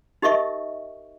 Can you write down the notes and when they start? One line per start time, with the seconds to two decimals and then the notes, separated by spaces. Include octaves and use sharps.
0.22 D#4 G4 A#4 D#5 E5 C#6